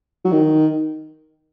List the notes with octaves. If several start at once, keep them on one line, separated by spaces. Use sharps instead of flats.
F#3
D#3